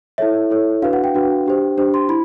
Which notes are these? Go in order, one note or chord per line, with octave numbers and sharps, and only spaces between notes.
E4 A4 C#5 E5
E4 A4 C#5
D4 F#4 B4 F5
F#5
G5
D4 F#4 B4
D4 G4 C5
D4 G4 C5
C6
E4 B5